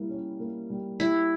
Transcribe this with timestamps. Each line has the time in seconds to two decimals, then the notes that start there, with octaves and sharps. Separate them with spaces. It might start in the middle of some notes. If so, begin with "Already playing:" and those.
Already playing: G3 A#3 E4
0.09 C#4
0.40 A#3
0.70 G3
1.00 G3 E4